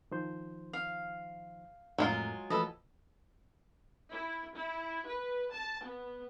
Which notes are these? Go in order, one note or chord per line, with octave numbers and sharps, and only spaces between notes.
D#3 F3 C5
F5
F2 A2 F#3 G#3 F4 A#4
E3 F3 A3 A4 B4 D#5
E4
E4
B4
A5
B3